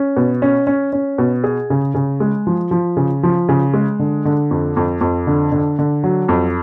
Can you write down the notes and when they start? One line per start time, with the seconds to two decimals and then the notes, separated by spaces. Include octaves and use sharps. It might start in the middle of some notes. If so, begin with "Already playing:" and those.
Already playing: C#4
0.16 B2
0.42 C#4
0.67 C#4
0.93 C#4
1.18 B2
1.44 G#4
1.70 C#3
1.95 C#3
2.20 G#3
2.47 F3
2.71 F3
2.97 C#3
3.23 F3
3.49 C#3
3.74 G#3
3.99 D3
4.25 D3
4.51 F2
4.77 F2
5.01 F2
5.27 D3
5.52 D3
5.79 D3
6.04 F#3
6.28 F2